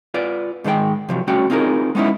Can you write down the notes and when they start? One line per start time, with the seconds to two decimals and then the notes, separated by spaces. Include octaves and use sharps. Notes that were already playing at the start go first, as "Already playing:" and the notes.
0.14 F4 B4 D5
0.64 G#2 D#3 G#3 G#4 G5
1.09 C3 F3 F#3
1.27 G2 A3 C#4 F#4 G5
1.50 C4 D#4 F4 G#4 A#4
1.95 G#3 B3 C#4 D#4 E4